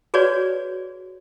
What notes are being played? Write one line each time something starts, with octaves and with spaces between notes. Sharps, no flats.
F#4 G#4 B4 C#5 D5